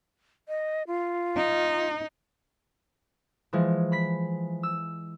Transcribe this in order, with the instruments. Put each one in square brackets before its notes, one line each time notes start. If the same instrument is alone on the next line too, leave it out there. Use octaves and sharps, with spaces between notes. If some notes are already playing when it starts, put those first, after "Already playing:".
[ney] D#5
F4
[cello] D#4
[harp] E3 F3 G#3
B5 B6
E6